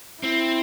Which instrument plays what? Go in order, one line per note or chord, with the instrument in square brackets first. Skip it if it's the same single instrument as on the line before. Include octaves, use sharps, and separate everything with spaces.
[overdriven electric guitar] C4 [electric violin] E4